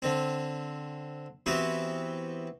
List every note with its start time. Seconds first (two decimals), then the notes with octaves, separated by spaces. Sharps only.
0.02 D3 C4
1.46 E3 B3 C4 F#4 G4